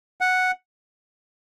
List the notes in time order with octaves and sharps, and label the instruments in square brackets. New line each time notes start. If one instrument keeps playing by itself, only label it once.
[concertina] F#5